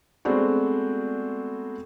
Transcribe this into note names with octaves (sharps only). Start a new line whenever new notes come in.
G#3 A3 B3 C4 D4 F#4